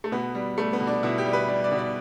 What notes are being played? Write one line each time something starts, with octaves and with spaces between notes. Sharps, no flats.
A3
B2 B3
G3
G3 A3
B3
B2
D4
B2 E4
G4
G3
B4
G3 D5
D5
B2
D5